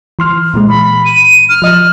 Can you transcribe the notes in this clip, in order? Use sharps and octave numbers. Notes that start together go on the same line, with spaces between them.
E3 C6 F6
A#2 E3 G#3
B5
D#7
F6
F3 D#5